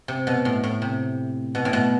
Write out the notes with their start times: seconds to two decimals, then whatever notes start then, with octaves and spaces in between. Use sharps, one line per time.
0.08 C3
0.27 B2
0.45 A2
0.64 A2
0.82 C3
1.55 B2
1.65 A2
1.73 B2